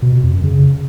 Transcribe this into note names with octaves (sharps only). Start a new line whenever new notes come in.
B2
B2
F2
F#2
C#3